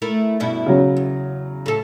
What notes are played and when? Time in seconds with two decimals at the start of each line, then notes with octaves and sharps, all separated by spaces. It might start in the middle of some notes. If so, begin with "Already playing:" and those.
0.02 A3 E4 A#4
0.40 G2 B2 E4
0.66 C#3 F#3
0.96 E2
1.66 A2 A4